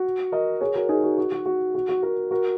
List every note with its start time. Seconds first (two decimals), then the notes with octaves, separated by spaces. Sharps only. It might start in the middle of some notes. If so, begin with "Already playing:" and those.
Already playing: F#4
0.32 A#4 D#5
0.61 G#4 C#5
0.75 F#4 A#4
0.89 D#4 G#4
1.03 F#4
1.18 F#4
1.32 F#4
1.46 F#4
1.75 F#4
1.89 F#4
2.03 F#4 A#4
2.31 F#4 A#4